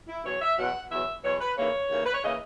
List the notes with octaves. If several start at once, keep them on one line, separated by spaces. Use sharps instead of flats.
E4
E2 B2 F#3 C#5
E5
E2 B2 F#3 F#5
E2 B2 F#3 E5
E2 B2 F#3 C#5
B4
D#2 C#3 E3 A#3 C#5
D#2 C#3 E3 A#3
B4
C#5
C#3 E3 A#3 D#5